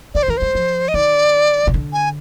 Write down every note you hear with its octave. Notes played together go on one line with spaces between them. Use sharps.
D3 D5
C5
D#3 A#4
G3 C5
F3
D#5
D#3 D5
C3
D3
G#5